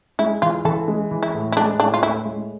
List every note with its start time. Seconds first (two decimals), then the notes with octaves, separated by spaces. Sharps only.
0.19 G#3 E4
0.42 E3 F4
0.65 E3 A4
0.88 G#3
1.11 E3
1.23 E4
1.35 A2
1.52 E4
1.57 G#3 D4
1.80 A2 D4
1.94 F4
2.02 A2 E4
2.25 G#3